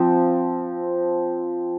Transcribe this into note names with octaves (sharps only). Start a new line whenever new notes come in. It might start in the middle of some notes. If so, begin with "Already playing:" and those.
Already playing: F3 C4